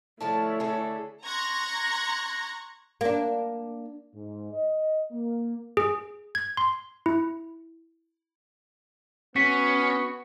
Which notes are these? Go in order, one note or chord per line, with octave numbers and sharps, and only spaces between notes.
D3 F3 A3 E4 C#5 A5
D3 G#4 A4
A#5 C6 C#6 F#6 G#6 A#6
A#3 D4
G#2
D#5
A#3
G#4
G#6
C6
E4
B3 C#4 F#4 B6